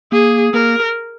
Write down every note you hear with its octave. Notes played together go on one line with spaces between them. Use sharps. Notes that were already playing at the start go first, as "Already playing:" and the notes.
A#3 G#4
A#3 A#4